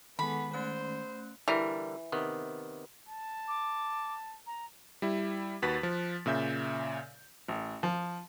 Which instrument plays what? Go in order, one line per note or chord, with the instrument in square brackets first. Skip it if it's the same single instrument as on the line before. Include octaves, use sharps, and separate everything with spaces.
[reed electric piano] D#3 G#3 [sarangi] B3 [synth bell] A4 F#5 G#5 [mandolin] B5
[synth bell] A3 C#4 F#6 [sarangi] C5
[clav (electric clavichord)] D3 G3 A#4 [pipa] E3
[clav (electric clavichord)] C3 D#3 B3
[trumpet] A5
[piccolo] D6
A#5
[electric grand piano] G3 E4
D#2 F#4 B4 F#6 A6 B6
F3
A#2 C#3 E5 G6
[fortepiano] A1
F3